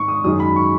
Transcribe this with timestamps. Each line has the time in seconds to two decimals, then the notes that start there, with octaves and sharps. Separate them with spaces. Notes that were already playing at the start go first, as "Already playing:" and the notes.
Already playing: G#2 D#3 G#3 C#6
0.08 D#6
0.24 F#2 D#3 G#3 D#6
0.40 B5
0.56 C#6